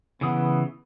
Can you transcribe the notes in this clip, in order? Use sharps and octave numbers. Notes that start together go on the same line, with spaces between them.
C#3 E3 B3 D#6